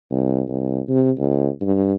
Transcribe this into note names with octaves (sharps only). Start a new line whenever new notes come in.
C2
C2
C3
C#2
G2